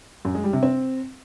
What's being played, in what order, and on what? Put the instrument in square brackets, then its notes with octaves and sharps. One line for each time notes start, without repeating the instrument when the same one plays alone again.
[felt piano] F#2
G#3
G3
C3
C4